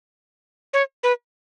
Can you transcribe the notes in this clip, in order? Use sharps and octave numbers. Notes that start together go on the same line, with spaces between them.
C#5
B4